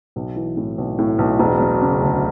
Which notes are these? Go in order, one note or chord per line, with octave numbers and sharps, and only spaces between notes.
B1
E3
A2
B1
A2
B1
E1
F#3
C#3
D2